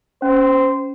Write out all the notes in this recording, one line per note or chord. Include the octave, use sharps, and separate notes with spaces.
C#4 C5